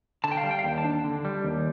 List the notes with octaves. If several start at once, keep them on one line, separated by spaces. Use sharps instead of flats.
D3 A5
G5
F5
G3
G5
F5
D#2 G5
A5
D4
D3
G3
D#2